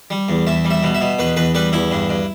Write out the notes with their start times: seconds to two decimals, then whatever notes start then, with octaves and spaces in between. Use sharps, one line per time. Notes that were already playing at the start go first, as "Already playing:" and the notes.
0.10 G3
0.29 E2
0.47 E2 E5
0.65 G3
0.71 E5
0.83 B2
0.95 E5
1.01 B2
1.19 E2 B4
1.36 E2 B4
1.54 G3 B4
1.73 E2 E4
1.92 G2
2.10 G2